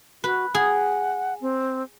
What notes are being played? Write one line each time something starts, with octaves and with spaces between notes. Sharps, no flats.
F#4 B4
G#4 F#5
C4